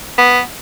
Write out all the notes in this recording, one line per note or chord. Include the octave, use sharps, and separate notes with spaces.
B3